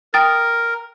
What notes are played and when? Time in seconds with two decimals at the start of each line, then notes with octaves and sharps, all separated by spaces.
0.14 A#4 G5 D#6 A6